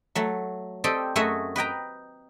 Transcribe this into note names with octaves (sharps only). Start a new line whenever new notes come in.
F#3 A3
C4 G4 A4 D5 D#5
F#2 A3 F#4 G#4 D#5 E5
B4 D#5 G5 A#5